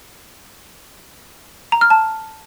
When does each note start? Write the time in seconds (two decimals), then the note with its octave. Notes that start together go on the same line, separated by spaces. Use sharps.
1.72 A#5
1.81 F6
1.90 A5